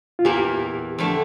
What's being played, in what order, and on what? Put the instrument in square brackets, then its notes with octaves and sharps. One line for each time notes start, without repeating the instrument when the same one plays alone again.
[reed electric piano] F4
[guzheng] E2 E3 A#3 [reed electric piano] G4
[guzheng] F2 D3 A3